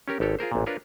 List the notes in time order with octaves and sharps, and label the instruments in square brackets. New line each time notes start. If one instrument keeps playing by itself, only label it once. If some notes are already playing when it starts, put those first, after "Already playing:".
[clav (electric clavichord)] C#4 G4 A#4
G#1 G4 A4 C#5
F4 G#4 A#4 C5
A1 A#2
D4 F4 A#4 B4 C#5